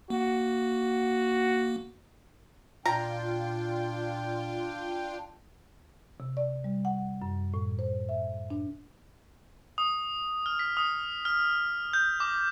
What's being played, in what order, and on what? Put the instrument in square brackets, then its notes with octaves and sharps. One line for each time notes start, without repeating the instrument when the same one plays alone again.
[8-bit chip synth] A#3 [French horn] F#4
[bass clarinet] A#2 [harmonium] D4 G5 [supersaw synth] F4 [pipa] A#5
[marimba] C3
D5
G3
F#5
F#2
A2
C5
E5
D4
[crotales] D#6
F6
B6
D#6
F6
G6
D6